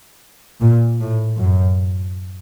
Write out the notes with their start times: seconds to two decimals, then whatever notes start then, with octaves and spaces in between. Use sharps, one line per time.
0.60 A#2
0.99 A2
1.37 F#2